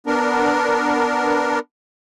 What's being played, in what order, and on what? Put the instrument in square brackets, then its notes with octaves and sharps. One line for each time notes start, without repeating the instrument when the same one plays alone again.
[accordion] B3 D4 A#4